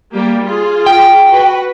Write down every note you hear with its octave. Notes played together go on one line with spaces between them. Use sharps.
G3 A#3 G4
F4 G#4
G5
F#4 B4